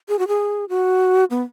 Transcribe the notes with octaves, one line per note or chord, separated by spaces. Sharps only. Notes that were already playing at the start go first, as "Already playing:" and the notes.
G#4
F#4
G#4
F#4
B3